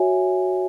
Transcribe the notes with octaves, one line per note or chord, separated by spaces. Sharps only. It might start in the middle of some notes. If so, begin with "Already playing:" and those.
Already playing: F#4 C#5 E5 G#5